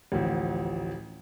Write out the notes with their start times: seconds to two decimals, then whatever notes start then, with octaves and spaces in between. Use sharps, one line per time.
0.12 A1 D2 F3